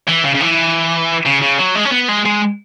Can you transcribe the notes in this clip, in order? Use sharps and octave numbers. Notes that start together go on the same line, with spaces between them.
E3
C#3
C#3
E3
C#3
C#3
F#3
G#3
C#4
B3
G#3
G#3